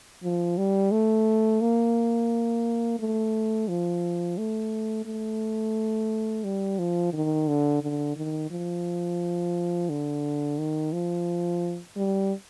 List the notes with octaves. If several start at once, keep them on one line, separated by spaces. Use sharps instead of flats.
F3
G3
A3
A#3
A3
F3
A3
A3
G3
F3
D#3
D3
D3
D#3
F3
D3
D#3
F3
G3